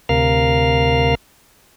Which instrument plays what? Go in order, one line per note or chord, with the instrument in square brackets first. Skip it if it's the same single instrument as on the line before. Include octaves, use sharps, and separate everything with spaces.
[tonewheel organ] D2 C3 A#4 F5 F6